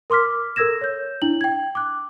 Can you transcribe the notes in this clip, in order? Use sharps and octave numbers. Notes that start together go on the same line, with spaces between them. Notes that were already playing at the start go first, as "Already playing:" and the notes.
A#4 C6 D6 F6 B6
A4 A#4 E6 G#6 A#6 E7
C#5 G6
D4 E4 F#7
G5 G#6
D6 F#6